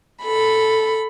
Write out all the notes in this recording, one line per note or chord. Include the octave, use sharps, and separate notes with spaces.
A4 B5